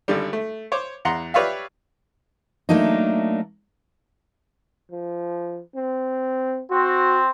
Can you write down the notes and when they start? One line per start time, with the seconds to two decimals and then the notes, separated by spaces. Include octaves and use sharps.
0.08 G#1 D3 G3
0.33 A3
0.72 C5 C#5 D6
1.05 E2 F#5 A#5 C6
1.34 G4 B4 C#5 D5 E5 F5
2.69 F#3 A3 A#3 D4 D#4
4.91 F3
5.75 C4
6.71 C4 F#4